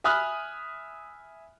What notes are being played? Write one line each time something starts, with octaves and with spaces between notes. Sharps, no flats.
E5 G#5 B5 D#6 F6 F#6